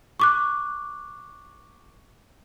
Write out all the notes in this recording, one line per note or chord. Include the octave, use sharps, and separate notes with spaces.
C#6 D6 F#6